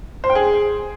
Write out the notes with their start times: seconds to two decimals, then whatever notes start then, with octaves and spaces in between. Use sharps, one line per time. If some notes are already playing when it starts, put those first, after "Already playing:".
0.24 C5
0.30 G5
0.35 G#4